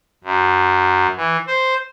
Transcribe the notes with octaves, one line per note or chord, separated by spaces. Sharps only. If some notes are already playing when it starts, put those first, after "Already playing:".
F#2
E3
C5